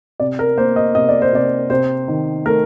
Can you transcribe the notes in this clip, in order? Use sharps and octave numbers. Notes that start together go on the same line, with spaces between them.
C3 D5
A#4
A#3 C5
D#5
C3 D#5
D5
C5
C3 D5
C3 C5
D#3
A3 A#4